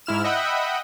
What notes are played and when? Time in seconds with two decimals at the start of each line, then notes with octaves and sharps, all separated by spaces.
0.06 G#2 E4 F6 E7
0.24 D#5 E5 F#5 G5 B5